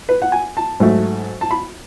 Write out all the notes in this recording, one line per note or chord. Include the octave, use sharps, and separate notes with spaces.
B4
F#5
G#5
A5
G#2 F#3 A3
A5
B5